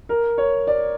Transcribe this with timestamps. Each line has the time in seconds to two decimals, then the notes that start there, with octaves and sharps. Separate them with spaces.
0.09 A#4
0.38 C#5
0.67 D5